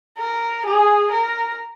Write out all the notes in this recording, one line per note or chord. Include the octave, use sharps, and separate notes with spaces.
A#4
G#4
A#4